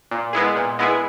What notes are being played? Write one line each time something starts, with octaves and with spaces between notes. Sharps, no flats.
A#2
G#3 B3 E4 G#4
A#2
G#3 B3 E4 G#4